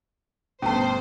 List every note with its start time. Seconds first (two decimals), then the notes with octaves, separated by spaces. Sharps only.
0.62 G1 B2 A3 B3 C#4 C5 A5